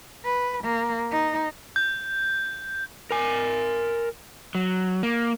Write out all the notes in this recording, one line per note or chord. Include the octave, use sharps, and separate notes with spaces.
B4
A#3
D#4
G6
A#4 G#5
F#3
A#3